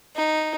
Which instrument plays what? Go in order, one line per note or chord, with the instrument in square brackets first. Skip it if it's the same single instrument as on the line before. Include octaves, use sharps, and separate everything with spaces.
[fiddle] D#4